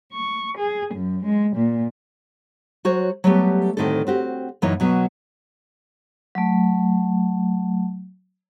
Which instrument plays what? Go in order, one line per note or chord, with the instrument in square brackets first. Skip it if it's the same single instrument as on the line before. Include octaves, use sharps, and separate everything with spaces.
[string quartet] C#6
G#4
F#2
G#3
A#2
[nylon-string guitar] F#3 F#4 C5 C#5
F#3 G3 A3 B3 G4
D2 A2 D#3 C4 D4 A4
C4 F#4 G4
F#2 A#2 E3 A#3 D#4 C#5
B2 F#3 A#3 B3
[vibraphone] F#3 A3